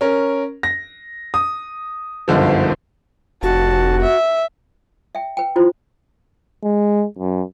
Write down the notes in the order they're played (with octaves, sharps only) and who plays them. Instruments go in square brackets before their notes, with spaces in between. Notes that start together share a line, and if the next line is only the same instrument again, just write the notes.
[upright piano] C#4 A#4
A#6
D#6
F#1 B1 G2 D3 F3
[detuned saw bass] F1 [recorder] F#4 [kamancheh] A5
[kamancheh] E5
[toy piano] E5 G5
B4 G5
E4 F4 C5
[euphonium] G#3
F#2